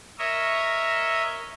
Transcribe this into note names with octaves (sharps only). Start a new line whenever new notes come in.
A#4 C#5 D#5 E5